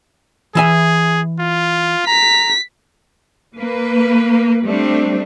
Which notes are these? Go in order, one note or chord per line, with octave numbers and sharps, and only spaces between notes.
E3 G#4 E5 G#5
F4
A#5 B6
A#3 B4
G3 A3 C4 D4